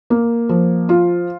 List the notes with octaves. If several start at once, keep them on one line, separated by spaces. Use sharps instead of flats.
A#3
F3
F4